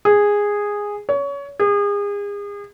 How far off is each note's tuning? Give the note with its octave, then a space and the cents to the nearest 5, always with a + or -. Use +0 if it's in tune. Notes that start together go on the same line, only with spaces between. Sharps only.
G#4 -10
C#5 +25
G#4 -35